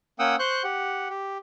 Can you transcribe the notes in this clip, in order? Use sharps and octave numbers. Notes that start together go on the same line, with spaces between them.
A#3 C#4 F#5 G5 D#6 E6
C5 C#6 F#6 G6
G4 F#5
G4